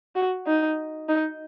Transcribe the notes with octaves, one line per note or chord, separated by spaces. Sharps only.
F#4
D#4
D#4